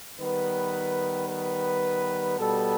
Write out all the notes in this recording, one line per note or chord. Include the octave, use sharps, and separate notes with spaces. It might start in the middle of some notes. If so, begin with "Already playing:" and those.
D#3 G3 B3 B4
B4
B2 G3 B3 A4